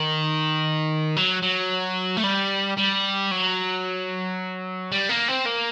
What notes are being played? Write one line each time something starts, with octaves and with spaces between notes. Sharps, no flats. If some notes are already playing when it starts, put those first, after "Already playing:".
Already playing: D#3
F#3
F#3
A3
G3
G3
F#3
G3
A#3
C4
A#3